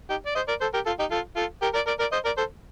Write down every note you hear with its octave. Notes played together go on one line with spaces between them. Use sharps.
D#4 G4
D5
C5 D#5
A#4 D5
A4 C5
G4 A#4
F4 A4
D#4 G4
F4 A4
F4 A4
G4 A#4
A#4 D5
A#4 D5
A#4 D5
C5 D#5
A#4 D5
A4 C5